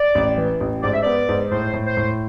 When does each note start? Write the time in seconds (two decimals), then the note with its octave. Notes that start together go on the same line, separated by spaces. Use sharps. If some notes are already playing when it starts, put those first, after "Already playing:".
Already playing: D5
0.15 A1
0.38 E3
0.60 A1
0.82 G#2 D5
0.93 E5
1.02 B3 D5
1.29 G#2
1.51 A2 C5
1.73 A2
1.86 C5
1.97 A2